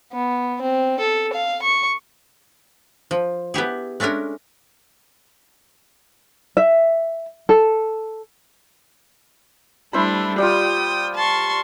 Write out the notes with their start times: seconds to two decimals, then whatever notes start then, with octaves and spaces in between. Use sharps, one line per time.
0.12 B3
0.62 C4
0.99 A4
1.33 F5
1.62 C#6
3.11 F3
3.54 B3 E4 G4 G#4
4.00 G#3 A3 C#4 D4 A#4
6.57 E5
7.49 A4
9.93 G3 A3 D4 E4 C5 B5
10.38 G3 F4 G5 D#6
11.15 A5 C6 C#6